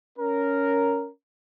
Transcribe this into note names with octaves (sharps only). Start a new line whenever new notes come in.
C#4 A#4